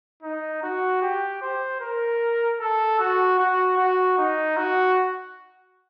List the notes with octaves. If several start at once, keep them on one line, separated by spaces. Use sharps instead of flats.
D#4
F#4
G4
C5
A#4
A4
F#4
F#4
F#4
D#4
F#4